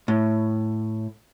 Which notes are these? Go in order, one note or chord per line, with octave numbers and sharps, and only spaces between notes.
A2